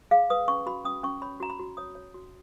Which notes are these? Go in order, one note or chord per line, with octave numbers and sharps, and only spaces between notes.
G#4 F5
B4 D#6
C#4 C#6
F#4 B5
C#4 D#6
C#4 C#6
C#5 B5
F#4 A#5
B5
F#4
C#5 D#6
C#5
F#4